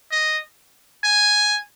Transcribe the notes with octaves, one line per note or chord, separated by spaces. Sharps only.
D#5
G#5